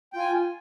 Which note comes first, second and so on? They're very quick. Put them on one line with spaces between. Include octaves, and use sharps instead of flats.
G5 F4 G#5